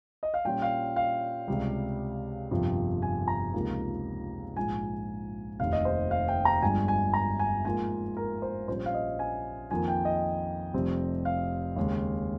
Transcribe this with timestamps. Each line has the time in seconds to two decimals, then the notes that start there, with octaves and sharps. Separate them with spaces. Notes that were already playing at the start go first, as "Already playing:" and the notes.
0.23 D#5
0.34 F5
0.45 A#2 G3 C#4 F4 G5
0.62 F5
0.96 F5
1.48 C#2 C3 G3
2.51 G1 F2 C3 F3
3.02 G#5
3.28 A#5
3.54 C#2 C3 F3 A#3 D#4
4.57 A#1 G#2 F3 G#5
5.60 F1 D#2 D#3 F5
5.73 D#5
5.85 C5
6.11 F5
6.28 G5
6.45 A#5
6.62 G1 G2 F3 G#3 G#5
6.88 G#5
7.14 A#5
7.39 G#5
7.65 G#2 F3 A#3 F4 G#5
8.17 A#4
8.42 C5
8.68 A#1 A#2 G3 C#4 C5
8.86 F5
8.94 D#5
9.19 G#5
9.71 F2 D#3 A#3 F4 G#5
9.88 G5
10.05 D#5
10.74 F1 F2 C3 G3 C4
11.25 F5
11.76 D#2 C#3 G#3